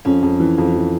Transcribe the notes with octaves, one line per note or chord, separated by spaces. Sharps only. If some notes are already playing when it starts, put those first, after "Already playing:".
F2 C#4
F2
E3
F2
E3